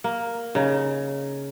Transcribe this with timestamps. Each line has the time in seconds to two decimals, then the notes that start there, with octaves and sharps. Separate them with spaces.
0.04 A#3
0.55 C#3 D#4